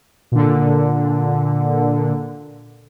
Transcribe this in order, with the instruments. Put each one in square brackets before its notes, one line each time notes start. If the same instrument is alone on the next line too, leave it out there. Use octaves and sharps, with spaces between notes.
[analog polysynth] A#2 D3